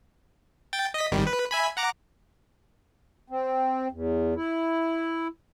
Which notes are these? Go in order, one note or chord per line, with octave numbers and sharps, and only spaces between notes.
G5 A6
D#5 B6
G#1 D#3 G3
B4
E5 G#5 B5
F#5 A#5 D6
C4
E2
E4